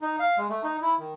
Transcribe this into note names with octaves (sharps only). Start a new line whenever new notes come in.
D#4
F5
G#3
A3
D#4
E4
D#3